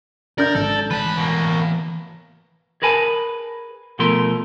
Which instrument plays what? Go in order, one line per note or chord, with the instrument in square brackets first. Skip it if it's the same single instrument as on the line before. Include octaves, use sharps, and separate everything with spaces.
[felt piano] D4 G6 [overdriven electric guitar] A#4 [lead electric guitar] D5
[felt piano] G#1 [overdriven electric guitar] A4
[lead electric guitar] E3 A5 [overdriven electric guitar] B4
[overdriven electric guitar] B2 A#3
[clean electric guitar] G#4 A#4 B4 G#5 A5
B2 F3 A3 A#4 C6